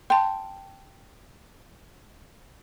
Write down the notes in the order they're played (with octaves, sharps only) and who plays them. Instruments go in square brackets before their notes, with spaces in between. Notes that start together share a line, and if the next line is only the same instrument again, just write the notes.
[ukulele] G5 [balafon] A5 C6